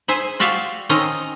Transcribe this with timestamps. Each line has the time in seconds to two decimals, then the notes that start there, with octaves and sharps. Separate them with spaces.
0.08 G#4 C5 E5 G#5
0.40 F4 F#4 D5 E5 F5 G5
0.89 D#3 C4 C#4 D#5 G5 A#5